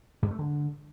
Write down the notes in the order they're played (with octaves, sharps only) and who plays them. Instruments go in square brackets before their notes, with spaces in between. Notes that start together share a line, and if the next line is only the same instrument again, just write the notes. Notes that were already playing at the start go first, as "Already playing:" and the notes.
[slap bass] G2
A3
D3